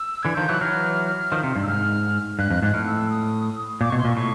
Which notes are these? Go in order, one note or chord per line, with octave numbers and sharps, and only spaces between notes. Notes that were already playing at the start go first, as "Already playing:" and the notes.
Already playing: E6
D3 E3 G#6
D#3 F3 G6
E3 F#3 F#6
E3 F#3 F6
D#3 F3
C3
G2
E6
G#2 F6
G2 F#6
F2
G#2 F#6
A2 F6
E6
E6
D#6
A#2 D6
B2 C#6
C6
A#2 C#6
A2 C#6